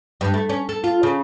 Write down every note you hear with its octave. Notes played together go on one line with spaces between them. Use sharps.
G2
A3
C#4
A4
F4
C#3